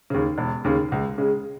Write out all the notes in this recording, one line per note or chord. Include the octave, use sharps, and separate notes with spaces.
D#2 C#3
E1
D#2 C#3
C#2
C#3 G#3